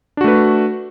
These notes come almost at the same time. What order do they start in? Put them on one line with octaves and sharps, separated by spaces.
D4 F#4 A3 B4